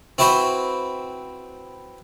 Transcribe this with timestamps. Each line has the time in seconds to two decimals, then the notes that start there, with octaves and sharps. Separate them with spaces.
0.18 C4 E4 F#4 B4 C5